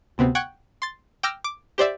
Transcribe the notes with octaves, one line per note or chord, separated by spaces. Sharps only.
D2 C3 B3 C4
F#5 G5 C#6 F#6 G#6
C6 A6
G5 D6 E6 F6 A#6
D6
G4 C5 D5 E5